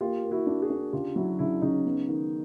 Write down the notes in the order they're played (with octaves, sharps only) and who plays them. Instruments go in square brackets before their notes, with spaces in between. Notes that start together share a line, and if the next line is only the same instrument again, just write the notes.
[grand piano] A#3 [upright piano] F4 G4
[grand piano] A#3
[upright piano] E4 F#4
[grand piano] D4
[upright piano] F#4 G#4
[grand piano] D4
[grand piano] C#3 [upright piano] F4 G4
[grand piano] F#3 [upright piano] E4 F#4
[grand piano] C#3 [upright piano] D4 E4
[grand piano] C#3 [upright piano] C#4 D#4
[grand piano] B3
D#3